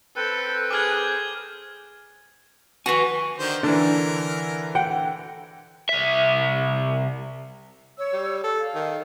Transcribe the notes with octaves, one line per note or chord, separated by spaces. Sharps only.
C4 A4 B4 G5
G#4 D6 F6 G#6
F#4 B4 G#5 C#6
D3 D#3 C5
D3 E3 D4 A#4
F#5 G5
C2 E5
C#5 E6
G3
A4
F5
D#3